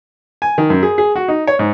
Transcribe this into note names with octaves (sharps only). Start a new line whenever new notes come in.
G#5
D#3
F#2
G#4
G#4
F#4
D#4
C#5
G#2